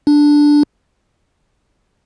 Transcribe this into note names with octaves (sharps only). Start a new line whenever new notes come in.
D4